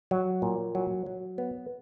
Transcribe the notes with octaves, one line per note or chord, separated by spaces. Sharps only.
F#3
A#2
F#3
F#3
B3